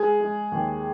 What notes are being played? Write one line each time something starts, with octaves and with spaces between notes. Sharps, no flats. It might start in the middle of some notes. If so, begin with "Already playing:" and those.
Already playing: G#3 G#4
G#3
D#2